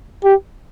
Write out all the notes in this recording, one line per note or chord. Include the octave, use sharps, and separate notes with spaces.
G4